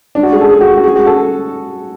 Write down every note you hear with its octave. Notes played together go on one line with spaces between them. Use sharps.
D4
F#4
G#4
A4
G#4
F#4
F#4
G#4
F#4
A4